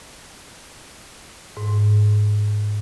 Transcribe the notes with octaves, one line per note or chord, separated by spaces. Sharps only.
G#2